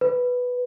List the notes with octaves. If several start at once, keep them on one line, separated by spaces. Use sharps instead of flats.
B4